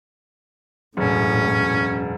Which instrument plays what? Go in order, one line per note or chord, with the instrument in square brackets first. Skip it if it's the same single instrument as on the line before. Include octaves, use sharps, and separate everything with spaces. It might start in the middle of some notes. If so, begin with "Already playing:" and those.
[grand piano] E1 F#2 [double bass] A2 [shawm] C#4